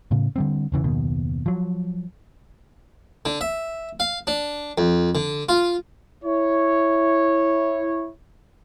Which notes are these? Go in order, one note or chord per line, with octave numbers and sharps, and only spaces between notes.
A2 C#3
D3 G3 C4
E1 C#3 E3
F#1 D#2 B2 D#3
F3 F#3
D3
E5
F5
D4
F2
D3
F4
E4 C#5